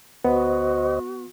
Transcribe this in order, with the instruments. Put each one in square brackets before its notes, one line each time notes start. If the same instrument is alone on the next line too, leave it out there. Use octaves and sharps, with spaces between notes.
[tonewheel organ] D2 C5 D#5 [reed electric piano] B3 [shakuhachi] F#4